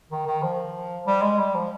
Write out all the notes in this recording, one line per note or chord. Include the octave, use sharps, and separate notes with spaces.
D#3
D#3
F3
G3
G#3
G3
F3